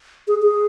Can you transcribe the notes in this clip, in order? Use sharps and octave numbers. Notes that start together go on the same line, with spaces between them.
G#4
G#4